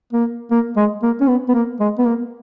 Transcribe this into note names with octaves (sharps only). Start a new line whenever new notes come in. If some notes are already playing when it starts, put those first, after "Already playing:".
A#3
A#3
G#3
A#3
C#4
B3
B3
A#3
G#3
B3
A#3